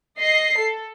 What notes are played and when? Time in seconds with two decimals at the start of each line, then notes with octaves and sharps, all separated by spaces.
0.18 D#5 C7
0.58 A4